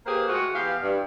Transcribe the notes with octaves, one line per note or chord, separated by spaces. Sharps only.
A#3 G4 G#4 B4 C5
G#3 A3 F4 F#4
E3 B3 G4 F5
G2